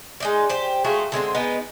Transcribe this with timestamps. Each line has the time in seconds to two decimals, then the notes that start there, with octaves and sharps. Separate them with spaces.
0.20 G#3 D#4 D5
0.50 G4 C5
0.84 G#3 A3 F4 F#4
1.12 D3 G#3 B3 C4
1.35 G#3 B3 D#4